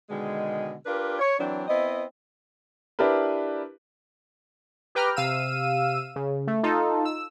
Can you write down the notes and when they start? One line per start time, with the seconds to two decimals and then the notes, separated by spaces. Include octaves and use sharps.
0.09 B2 D3 D#3 G#3
0.86 D4 F4 G4 A#4 B4
1.19 C#5
1.39 E3 F#3 C4 D4
1.68 B3 C4 E4 D#5
2.99 D4 E4 G4 A#4 B4
4.95 G4 B4 G5 A#5 F6
5.16 C3 F5 E6 D#7
6.16 C#3
6.47 A3
6.63 D#4 F4 A4
7.05 E6